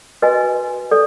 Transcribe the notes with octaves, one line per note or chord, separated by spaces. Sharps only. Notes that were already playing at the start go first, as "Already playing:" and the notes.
F#4 B4 D#5 G#5
A4 D5